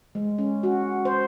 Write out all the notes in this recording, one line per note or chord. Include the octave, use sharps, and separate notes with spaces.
G#3
C#4
F#4
C5